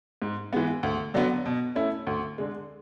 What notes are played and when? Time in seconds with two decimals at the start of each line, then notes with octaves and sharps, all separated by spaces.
0.22 G#2
0.53 E3 G#3 B3
0.83 D2
1.14 D3 F#3 B3
1.46 B2
1.75 A3 C#4 E4
2.07 D2
2.38 D3 G#3